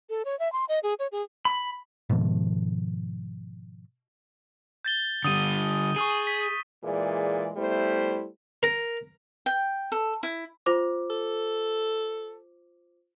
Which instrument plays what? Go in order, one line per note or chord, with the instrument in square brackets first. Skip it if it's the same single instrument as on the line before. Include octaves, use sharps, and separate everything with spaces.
[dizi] A4
C#5
E5
C6
D#5
G#4
C#5
G#4
[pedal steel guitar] B5
[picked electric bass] G#2 B2 D#3 F3
[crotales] G6 A6 G7
[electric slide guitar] D3 G3 [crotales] D#6 D#7
[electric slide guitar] G#4 [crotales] C#6 D#6 D#7
[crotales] B6
[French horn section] A#2 E3 G#3 G#4 D5
G3 A3 B3 E4 C5
[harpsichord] A#4
[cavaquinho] G5
A4
E4
[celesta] F4 C5 D6
[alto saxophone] A4